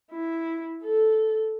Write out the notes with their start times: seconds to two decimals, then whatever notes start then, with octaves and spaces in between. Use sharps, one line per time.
0.11 E4
0.84 A4